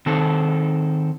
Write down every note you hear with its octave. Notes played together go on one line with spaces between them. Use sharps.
D#3 C4 A4